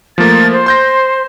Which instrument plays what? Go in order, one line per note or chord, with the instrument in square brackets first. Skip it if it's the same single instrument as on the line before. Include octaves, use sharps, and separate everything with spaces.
[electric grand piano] F3 A3 A#3 [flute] A6
[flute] C5
[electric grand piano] C6 G6 A#6